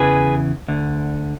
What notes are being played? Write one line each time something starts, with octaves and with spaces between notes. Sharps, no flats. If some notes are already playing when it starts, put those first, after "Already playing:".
Already playing: E2 C#3 E3 G#4 B4
D2 D3